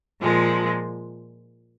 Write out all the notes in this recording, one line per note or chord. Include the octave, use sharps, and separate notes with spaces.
A#2 F3 G#3